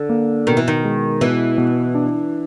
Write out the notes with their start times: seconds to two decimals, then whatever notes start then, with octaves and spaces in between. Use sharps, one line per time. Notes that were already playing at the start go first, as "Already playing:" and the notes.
Already playing: D3
0.09 A#3
0.47 B2 D#3
0.57 E3
0.68 D#3
0.84 G#3
1.21 B2 E3
1.58 B2
1.95 D4